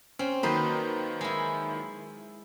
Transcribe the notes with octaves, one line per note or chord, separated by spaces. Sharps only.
C4 C#4
D#3 F#3 A#3 D#4 B4 C5
G#3 E4